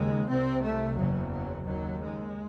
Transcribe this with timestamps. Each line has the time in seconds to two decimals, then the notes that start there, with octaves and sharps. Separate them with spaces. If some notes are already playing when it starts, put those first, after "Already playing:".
Already playing: D#2 C#3 G#3
0.25 C2 C3 C4
0.59 A3
0.94 F#1 E2 C#3 F#3
1.29 F#3
1.64 D#2 C#3 F#3
1.99 G#3